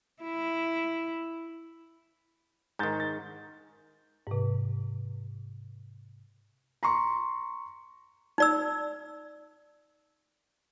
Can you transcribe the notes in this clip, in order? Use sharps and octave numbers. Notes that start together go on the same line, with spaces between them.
E4
G#2 D#3 A#5 G6 A6
A6
G#2 C3
A#5 C6 C#6
D#4 D5 E6